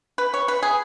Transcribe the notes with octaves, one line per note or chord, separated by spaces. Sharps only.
B4
C#5
B4
G#4